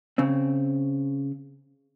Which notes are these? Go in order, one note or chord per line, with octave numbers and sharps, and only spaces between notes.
C#3 C4